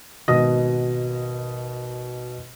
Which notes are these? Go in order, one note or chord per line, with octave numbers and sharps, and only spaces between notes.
G#1 B2 F#4 D#5 D#6 A#6